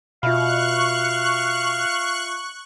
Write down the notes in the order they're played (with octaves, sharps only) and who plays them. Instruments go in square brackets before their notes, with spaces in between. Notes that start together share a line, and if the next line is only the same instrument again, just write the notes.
[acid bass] B2 [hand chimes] F4 E5 B5 [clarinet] F5 [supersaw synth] C#6 F#6